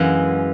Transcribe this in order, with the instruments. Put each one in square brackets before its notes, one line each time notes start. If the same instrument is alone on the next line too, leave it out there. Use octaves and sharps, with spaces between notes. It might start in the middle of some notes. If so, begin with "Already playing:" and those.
Already playing: [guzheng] F#2 E3 G#3 A#3